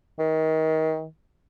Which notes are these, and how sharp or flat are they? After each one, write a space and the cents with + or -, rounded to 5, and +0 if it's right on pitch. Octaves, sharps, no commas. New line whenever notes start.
D#3 +30